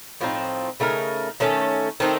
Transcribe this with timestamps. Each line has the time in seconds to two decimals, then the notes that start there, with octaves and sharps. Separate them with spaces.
0.20 A2 F3 C4 D#4
0.80 C#3 A3 D#4 A#4
1.40 D#3 A3 C#4 A4
2.00 D#3 A3 C4 D#4